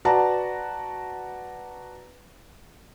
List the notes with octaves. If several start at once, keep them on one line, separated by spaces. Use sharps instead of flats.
F#4 B4 D5 F#5 A5 A#5